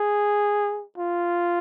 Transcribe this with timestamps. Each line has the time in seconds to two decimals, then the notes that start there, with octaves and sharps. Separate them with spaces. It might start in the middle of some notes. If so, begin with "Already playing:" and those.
Already playing: G#4
0.98 F4